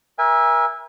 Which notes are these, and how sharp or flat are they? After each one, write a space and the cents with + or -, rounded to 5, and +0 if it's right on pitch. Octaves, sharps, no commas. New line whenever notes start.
A#4 +35 E5 -5 G#5 -25